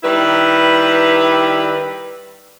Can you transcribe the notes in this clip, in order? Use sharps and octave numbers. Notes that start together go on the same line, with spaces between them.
D#3 G3 E4 B4